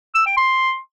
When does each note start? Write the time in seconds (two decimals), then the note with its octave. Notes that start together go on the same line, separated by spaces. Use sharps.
0.15 E6
0.26 G5
0.37 C6